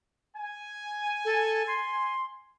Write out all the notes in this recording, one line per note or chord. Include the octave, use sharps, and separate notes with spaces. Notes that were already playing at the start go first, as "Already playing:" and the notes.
G#5
A4
C6